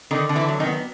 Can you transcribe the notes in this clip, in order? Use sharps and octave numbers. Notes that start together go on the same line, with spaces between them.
D3 D#3 D#4
D3
E3 E4
F#3
D#3 D#4
B3